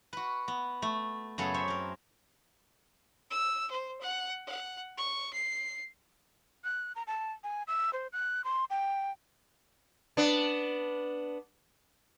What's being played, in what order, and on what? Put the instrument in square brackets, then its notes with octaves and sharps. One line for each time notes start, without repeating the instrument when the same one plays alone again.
[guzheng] F#4 B4
B3
A3
F#2 C#3 B3 G#4 A4
C5 C#5 E5
C4 A#4
[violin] E6
C5
F#5
F#5
C#6
C7
[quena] F#6
A#5
A5
G#5
E6
C5
F#6
C6
G5
[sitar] B3 D4